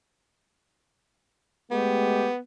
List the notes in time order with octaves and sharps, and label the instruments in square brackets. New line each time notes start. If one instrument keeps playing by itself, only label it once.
[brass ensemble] G#3 A3 G4 [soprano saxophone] B3